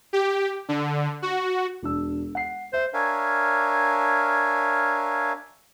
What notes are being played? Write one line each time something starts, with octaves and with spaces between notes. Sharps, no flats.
G4
D3
F#4
E1 D4 E6
F#5 C7
C5 E5
D4 A#4 C#5 E5 F5 G#5